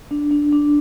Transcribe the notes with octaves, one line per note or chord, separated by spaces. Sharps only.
D4
D4
D4